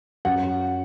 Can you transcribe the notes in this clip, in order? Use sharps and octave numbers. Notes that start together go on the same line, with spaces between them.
F#2 F#5